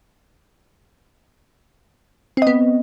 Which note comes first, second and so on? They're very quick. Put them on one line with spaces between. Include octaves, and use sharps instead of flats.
C4 D#5 B3